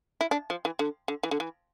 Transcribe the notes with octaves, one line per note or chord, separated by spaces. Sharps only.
E4
D4
F3
E3
D3
D3
E3
D3
E3